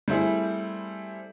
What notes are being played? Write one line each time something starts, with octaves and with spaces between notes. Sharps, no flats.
G3 A3 C4 E4 G#4